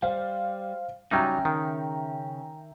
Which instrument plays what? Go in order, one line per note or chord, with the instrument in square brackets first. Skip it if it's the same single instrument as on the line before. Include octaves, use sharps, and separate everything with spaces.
[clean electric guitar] G3 [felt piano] C5 F5
[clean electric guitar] C#3 C#4 [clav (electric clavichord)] F#3 G3 D#4 [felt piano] E5 G5 A#5
[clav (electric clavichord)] D#3